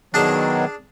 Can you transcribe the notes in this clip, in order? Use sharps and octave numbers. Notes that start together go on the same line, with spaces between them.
B2 D#3 F#3 D4 G#4 A5